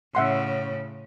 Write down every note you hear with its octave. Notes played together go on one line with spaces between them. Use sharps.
A2 C#3 E5 F#5 C6